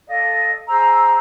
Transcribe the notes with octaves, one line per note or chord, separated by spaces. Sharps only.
A4 D5 D#5 F5
G#4 C5 A#5 E6